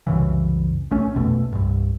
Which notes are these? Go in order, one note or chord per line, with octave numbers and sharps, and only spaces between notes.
C2 F#2 C#3 E3
A#1 A3 C#4
A#1 F2 B2 A3
C2 G2